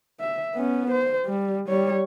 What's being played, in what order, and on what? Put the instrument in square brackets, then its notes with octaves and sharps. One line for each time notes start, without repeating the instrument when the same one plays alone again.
[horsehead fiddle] E5
B3 C#4
C5
G3
G3 C#5